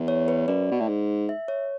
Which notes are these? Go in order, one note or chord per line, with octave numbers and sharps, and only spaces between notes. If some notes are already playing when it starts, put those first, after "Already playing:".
Already playing: E2
C#5
B4
F#2 D5
B2
A2
G#2
E5
C#5